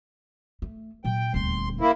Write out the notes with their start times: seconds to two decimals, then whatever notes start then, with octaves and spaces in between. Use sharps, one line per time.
0.62 A3
1.04 A#2 F#3 G5
1.34 D#1 D2 C6
1.81 A#3 E4